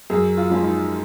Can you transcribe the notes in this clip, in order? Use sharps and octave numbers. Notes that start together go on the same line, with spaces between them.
F#2 G#4
F4
F3 G#3 C#4
D#4